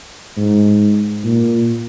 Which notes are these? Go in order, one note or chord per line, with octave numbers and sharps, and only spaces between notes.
G#2
A#2